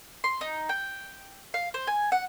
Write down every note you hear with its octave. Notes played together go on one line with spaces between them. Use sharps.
C6
D#4
G5
F5
C5
G#5
F#5